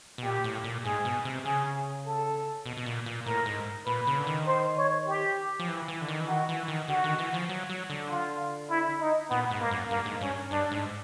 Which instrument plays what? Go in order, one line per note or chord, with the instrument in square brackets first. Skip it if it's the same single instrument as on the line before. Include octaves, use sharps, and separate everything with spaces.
[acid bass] B2
[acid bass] A#2 [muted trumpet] G4
[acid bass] A2
A#2
[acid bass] G#2 [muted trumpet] G#4
[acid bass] B2
C3
[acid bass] C#3 [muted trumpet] G#4
[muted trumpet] A4
[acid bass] B2
B2
A#2
A#2
[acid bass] A2 [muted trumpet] A#4
[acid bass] G#2
[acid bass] A#2 [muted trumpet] B4
[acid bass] C#3
D3
D#3
[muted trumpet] C5
C#5
G4
[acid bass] F3
E3
E3
D3
D#3
E3
[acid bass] D#3 [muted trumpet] F#4
[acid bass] E3
D#3
[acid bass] D3 [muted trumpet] F#4
[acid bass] D#3
E3
F3
F#3
F#3
D3
[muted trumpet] F4
E4
D#4
[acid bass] A#2 [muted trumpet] B3
[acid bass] G#2
[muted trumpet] A#3
[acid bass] F#2
[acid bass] G2 [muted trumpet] A#3
[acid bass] G#2
[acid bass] G2 [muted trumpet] C#4
[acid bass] G2 [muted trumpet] D4
[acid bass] G#2